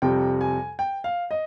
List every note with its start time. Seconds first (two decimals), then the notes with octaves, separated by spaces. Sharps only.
0.02 F2 C3 G3 G5
0.41 G#5
0.79 G5
1.04 F5
1.31 D#5